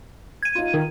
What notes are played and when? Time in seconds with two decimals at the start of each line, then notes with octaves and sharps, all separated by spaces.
0.43 G#6 D#7
0.55 D#4 F4
0.74 D#3